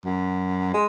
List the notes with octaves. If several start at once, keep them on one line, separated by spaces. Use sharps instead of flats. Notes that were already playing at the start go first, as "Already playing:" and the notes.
F#2
G#3